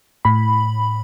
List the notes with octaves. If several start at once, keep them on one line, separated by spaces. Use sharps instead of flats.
A2 B5